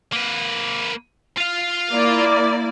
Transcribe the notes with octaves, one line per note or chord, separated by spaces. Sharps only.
A#3 B4
F4 F5
A#3 E4 D5